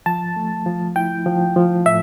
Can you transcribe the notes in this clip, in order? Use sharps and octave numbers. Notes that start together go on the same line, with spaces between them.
F3 A5
A3
F3
E4 G5
F3
F3
A2 E5